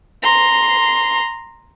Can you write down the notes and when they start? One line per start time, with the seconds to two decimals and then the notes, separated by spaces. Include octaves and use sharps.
0.23 A#5 C6